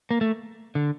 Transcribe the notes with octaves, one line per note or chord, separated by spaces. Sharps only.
A#3
A3
D3